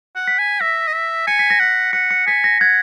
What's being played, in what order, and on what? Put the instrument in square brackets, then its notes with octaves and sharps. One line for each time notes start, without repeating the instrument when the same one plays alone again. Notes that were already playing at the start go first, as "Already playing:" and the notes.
[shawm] F#5
[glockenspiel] B6
[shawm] G#5
[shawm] E5 [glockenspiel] A#6
[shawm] D#5
E5
[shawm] G#5 [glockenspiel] C#7
[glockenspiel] B6
A#6
[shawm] F#5 [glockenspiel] B6
[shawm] F#5 [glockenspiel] C#7
[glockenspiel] C#7
[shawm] G#5 [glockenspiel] B6
[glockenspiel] A#6
[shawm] F#5 [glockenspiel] G#6